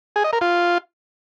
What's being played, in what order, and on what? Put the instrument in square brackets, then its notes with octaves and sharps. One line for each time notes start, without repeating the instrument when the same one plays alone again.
[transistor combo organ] G#4
D#5
A#4
F4